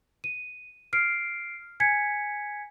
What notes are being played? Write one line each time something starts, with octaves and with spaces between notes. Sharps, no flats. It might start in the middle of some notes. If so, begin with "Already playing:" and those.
D#7
F6 C7 D7
G#5 G#6 B6 C#7